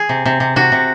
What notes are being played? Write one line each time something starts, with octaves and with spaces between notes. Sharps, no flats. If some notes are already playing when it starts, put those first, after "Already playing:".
Already playing: G#4
C3
C3
C3
C3 F#4
C3